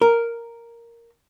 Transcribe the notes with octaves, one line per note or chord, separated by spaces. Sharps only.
A#4